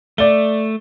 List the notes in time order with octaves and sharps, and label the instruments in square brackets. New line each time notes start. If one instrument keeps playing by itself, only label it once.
[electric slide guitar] A3 [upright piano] D5 G7